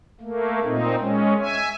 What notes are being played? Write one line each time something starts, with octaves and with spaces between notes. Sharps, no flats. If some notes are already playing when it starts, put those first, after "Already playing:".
A3 A#3
A#2 C4 D#4
G#3 C#4
E5 G#5